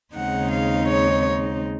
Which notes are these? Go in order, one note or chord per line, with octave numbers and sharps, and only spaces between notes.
D#2 C#3 G#3 C4 D#4 F#5
F5
C#5